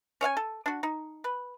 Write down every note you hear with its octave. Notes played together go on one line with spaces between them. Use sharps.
C#4 C#5 F5 G#5
A4
D4 F#4
D#4
B4